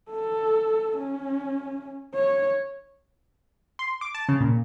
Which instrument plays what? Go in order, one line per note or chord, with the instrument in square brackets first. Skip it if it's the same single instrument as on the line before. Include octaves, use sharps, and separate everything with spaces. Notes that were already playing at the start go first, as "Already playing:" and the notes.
[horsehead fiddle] A4
C#4
C#5
[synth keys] C6
D6
A5
C#3
A#2